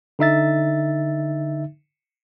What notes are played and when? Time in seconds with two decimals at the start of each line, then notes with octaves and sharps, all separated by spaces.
0.19 D3 D#4 E5 A6